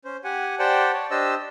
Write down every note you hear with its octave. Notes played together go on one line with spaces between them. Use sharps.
C#4 C5
G4 F#5 G#5
G4 C5 D5 F#5 G5 A5
C#5 A5
D4 G4 C5 D#5 A5 E6